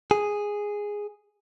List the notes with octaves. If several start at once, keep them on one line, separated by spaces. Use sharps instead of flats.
G#4